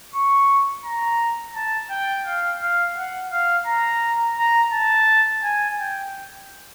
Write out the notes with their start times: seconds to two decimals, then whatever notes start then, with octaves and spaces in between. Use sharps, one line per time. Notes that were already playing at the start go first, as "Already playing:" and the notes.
0.14 C#6
0.85 A#5
1.55 A5
1.90 G5
2.25 F5
2.62 F5
2.97 F#5
3.32 F5
3.66 A#5
4.38 A#5
4.72 A5
5.43 G#5
5.80 G5